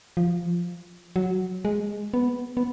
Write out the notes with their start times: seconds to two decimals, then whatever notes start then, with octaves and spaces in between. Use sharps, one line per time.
0.17 F3
1.16 F#3
1.65 G#3
2.14 B3
2.57 B3